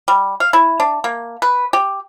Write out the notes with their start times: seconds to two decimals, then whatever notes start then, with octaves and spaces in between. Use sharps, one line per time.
0.08 G3
0.40 F5
0.53 E4
0.80 D4
1.04 A#3
1.42 B4
1.73 G4